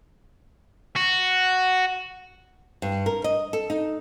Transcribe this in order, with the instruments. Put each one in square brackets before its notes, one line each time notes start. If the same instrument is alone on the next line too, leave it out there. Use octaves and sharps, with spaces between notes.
[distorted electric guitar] F#4
[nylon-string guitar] G2
A#4
D#5
A4
D#4